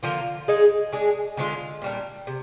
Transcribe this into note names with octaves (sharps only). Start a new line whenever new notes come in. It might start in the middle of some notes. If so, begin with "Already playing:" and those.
D3 F3 A#3 F4
G#3 D#4 G#4
G#3 D4 G#4
D3 G#3 D4 F4
A#2 G3 D4
C3